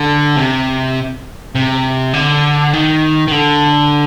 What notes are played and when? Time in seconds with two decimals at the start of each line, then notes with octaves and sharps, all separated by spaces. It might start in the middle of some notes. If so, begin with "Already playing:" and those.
Already playing: D3
0.37 C3
1.55 C3
2.14 D3
2.73 D#3
3.28 D#3
3.31 D3